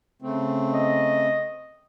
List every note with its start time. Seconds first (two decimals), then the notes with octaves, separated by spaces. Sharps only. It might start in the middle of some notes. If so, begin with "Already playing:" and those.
0.22 C#3 A3 C4
0.74 D#5